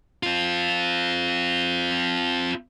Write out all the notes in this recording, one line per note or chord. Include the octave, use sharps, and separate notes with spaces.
C4 F4